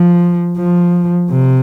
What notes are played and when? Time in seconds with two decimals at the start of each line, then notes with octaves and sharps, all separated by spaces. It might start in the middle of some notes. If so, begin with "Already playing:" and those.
Already playing: F3
0.58 F3
1.31 C3